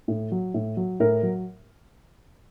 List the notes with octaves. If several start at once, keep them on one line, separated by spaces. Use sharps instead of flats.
A2
F#3
A2
F#3
A2 A#4
F#3